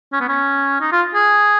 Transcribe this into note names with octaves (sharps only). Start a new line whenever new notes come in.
C#4
B3
C#4
D#4
F4
G#4